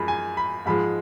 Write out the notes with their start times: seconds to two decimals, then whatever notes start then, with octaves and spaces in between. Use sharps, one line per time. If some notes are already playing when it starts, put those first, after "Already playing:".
Already playing: F#2 F3 G#3 B5
0.08 G#5
0.37 B5
0.66 G#2 F3 G#3 B5